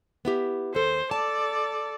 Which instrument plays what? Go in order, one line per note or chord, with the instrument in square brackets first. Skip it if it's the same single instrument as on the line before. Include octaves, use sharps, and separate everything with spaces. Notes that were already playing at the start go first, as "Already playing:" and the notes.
[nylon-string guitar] B3 E4 G4
[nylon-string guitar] D#2 A4 [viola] C5
[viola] A4 D5 [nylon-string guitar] A5